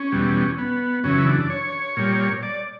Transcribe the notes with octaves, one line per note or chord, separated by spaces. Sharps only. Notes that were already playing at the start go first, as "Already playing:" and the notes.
Already playing: C#4
E2 B2 G3
B3
F#2 C#3 E3 C#4
E4
D4
C#5
A#2 G3
D5